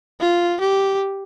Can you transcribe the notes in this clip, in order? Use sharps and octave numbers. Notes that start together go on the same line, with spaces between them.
F4
G4